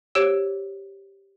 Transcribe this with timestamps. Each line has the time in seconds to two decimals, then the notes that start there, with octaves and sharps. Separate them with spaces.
0.15 G4 C5 C#5 E6 D7